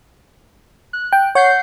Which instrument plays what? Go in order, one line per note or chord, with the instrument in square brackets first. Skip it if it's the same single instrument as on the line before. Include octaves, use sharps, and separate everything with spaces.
[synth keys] F#6
[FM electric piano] G5
[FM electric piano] C#5 [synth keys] F#5 G6 C7